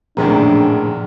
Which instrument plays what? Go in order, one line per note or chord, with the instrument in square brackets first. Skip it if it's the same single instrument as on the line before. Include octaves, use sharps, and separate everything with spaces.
[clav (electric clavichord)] A#1 A2 [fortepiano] F#2 C3 D#3 [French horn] D4 [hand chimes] G#4 A#5